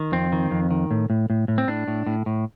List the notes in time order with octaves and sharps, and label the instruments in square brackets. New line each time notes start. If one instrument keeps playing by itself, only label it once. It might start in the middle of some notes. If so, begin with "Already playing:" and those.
Already playing: [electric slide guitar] D#3
F2 C4
D#3
F2
D#3
A2
A2
A2
A2
C4
A2 D4
A2
A2
A2